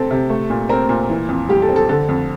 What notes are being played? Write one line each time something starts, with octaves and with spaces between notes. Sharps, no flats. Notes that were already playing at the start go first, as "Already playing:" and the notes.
Already playing: C3 C4 G4 A4
C3
A3
A#2
C4 A#4
A#2
E3
F2
G3 G4
A4
C4
A4
D3 A4
F2